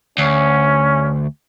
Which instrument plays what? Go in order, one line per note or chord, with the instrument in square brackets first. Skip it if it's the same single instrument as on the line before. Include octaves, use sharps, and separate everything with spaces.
[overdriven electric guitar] D2 [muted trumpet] C#4